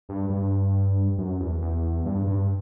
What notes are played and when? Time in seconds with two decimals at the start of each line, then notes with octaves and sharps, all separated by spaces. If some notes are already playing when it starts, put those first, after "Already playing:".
0.09 G2
0.30 G2
1.18 F#2
1.40 E2
1.62 E2
2.05 G2
2.27 G2